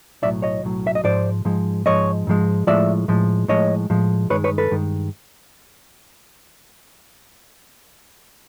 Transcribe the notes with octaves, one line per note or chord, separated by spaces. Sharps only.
B1 A2 F#3 D5 E5
C#5 D#5
B1 A2 F#3
E5
D#5
G#2 F3 G#3 C5 D5
G#2 F3 G#3
G#2 F3 G#3 C#5 D#5
G#2 F3 G#3
A2 F3 G#3 D5 E5
A2 F3 G#3
A2 F3 G#3 C#5 D#5
A2 F3 G#3
G2 D#3 G#3 B4 C#5
B4 C#5
A4 B4
G2 D#3 G#3